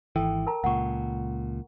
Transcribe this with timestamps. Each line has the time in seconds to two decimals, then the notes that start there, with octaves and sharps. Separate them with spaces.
0.16 G#1 E3 A4 G5 E6
0.47 A#4 A5 A#5
0.64 C#2 A#2 F#5 C#6